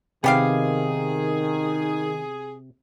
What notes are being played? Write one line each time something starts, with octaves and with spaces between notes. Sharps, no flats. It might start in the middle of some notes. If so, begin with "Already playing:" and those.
C3 D#3 B3 G4 G#4 F5